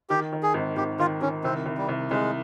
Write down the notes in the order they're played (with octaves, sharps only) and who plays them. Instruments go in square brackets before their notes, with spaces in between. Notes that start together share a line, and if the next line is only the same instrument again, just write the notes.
[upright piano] D#3 [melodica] G4
[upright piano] D#3
[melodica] G#4
[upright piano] G#1
[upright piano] G#1 [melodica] G4
[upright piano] D#3 [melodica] F4
[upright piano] D#3 [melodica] C#4
[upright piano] C2 [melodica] C4
[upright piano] C2
[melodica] G3
[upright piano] C2
[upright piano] C2 [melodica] G#3